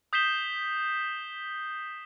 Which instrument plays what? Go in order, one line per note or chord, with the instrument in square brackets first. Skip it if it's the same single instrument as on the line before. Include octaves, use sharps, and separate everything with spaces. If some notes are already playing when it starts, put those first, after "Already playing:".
[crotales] D#6 G6 B6 C7 E7 G7